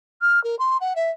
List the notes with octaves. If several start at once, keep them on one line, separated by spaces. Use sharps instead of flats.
F6
A#4
C6
F#5
E5